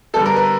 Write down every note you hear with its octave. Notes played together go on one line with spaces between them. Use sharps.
D3 G3 B3 A4
A#4
B4